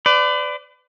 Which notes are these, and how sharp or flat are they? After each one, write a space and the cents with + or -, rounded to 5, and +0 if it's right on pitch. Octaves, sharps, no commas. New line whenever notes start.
B4 +40 D5 +0